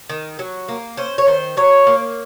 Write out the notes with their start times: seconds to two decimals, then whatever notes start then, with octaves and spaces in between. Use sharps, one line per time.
0.09 D#3
0.39 F#3
0.68 A#3
0.97 C#4 C5
1.18 C#5
1.27 D#3 C5
1.57 F#3 C#5
1.87 A#3